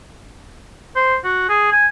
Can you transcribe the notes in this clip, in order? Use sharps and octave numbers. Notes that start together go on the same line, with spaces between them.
C5
F#4
G#4
G#5